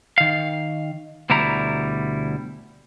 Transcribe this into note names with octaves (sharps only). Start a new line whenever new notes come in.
D#3 F5
D2 B2 G3 E4 A#5